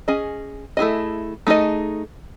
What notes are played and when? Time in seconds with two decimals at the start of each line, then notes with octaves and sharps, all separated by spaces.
0.08 C#4 G#4 D#5
0.77 A3 E4 G#4 D#5
1.47 A3 D#4 G#4 D#5